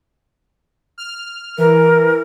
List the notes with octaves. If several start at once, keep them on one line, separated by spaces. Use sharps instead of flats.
F6
E3 A#4